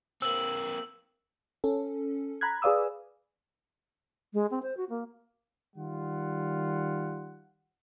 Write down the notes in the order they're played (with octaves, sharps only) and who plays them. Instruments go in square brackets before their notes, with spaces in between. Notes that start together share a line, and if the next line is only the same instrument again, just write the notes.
[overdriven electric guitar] A#3 C4 [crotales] E6 F#7
[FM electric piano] C#4 A4
A#5 B5 F#6 G#6
G#4 B4 D5 F5 D#6 E6
[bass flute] G#3
C4
C5
F#4
A#3
[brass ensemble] D#3 G3 F4 F#5